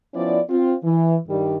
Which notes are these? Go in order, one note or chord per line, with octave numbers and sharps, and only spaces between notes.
F3 B3 C#4 E4 D5
C4 F4
E3
G2 D#3 G3